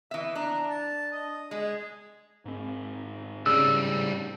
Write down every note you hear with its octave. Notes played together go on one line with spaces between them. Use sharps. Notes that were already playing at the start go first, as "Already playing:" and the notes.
E3 D#5 E5
D4 A#5
A5
D#5
G#3 G#4
G#2 C4
A2 C#3 G3 E6